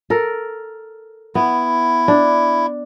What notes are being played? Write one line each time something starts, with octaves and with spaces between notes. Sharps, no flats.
A4 A#4
B3 E4
D4